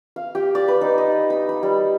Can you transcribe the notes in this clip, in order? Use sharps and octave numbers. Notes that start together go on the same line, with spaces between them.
F5
G4
D5
B4
D#4
D#5
B5
B5
G3